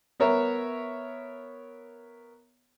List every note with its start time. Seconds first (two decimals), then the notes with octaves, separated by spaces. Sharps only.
0.20 B3 A#4 C#5 E5